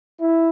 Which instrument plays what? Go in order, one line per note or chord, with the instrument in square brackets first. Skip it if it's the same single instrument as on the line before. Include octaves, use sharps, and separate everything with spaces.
[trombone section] E4